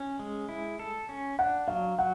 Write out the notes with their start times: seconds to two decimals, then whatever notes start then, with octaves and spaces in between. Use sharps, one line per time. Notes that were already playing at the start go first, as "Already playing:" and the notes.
Already playing: C#4
0.19 G#3
0.49 E4
0.79 A4
1.09 C#4
1.39 D4 F#5
1.68 F#3 F5
1.98 F#3 F#5